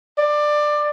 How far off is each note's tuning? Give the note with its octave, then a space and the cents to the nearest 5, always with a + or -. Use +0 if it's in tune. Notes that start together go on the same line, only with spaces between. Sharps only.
D5 +15